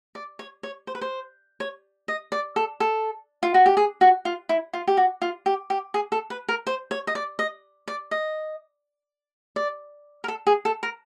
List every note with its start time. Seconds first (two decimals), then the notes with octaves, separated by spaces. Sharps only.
0.15 D5
0.39 C#5
0.63 C#5
0.87 C5
0.95 B4
1.01 C5
1.60 C#5
2.08 D#5
2.32 D5
2.56 A4
2.80 A4
3.43 F4
3.54 F#4
3.66 G4
3.77 G#4
4.01 F#4
4.25 F4
4.49 E4
4.73 F4
4.87 G4
4.97 F#4
5.22 F4
5.46 G4
5.70 G4
5.94 G#4
6.12 A4
6.30 B4
6.49 A#4
6.67 C5
6.91 C#5
7.07 D#5
7.15 D5
7.39 D#5
7.88 D5
8.11 D#5
9.56 D5
10.24 A#4
10.28 A4
10.47 G#4
10.65 A4
10.83 A#4